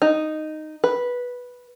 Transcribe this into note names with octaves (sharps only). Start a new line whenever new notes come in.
D#4
B4